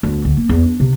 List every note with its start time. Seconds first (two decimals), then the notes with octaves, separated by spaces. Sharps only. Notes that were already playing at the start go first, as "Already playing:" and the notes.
0.03 D2
0.25 D2
0.37 A#3
0.49 E2
0.64 D4
0.80 C3